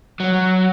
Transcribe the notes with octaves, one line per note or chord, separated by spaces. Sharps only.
F#3